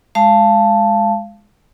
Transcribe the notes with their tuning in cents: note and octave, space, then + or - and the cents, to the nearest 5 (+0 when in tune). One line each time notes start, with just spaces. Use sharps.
G#3 +0 F5 -20 A5 +0